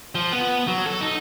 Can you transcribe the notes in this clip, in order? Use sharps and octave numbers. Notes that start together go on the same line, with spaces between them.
F3
B3
F#3
A4
D#4